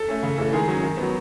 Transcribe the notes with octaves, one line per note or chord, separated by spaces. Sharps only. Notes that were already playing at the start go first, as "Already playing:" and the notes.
Already playing: A4
A3 C#4
C#3
E3 A3 C#4 A4
D#3 G#3 G#4
F#3 C#4
D#3
B3
F#3